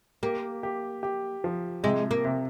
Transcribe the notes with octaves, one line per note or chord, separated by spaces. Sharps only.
A#3 G4
G4
G4
F3
C3 G#3
A#3
C3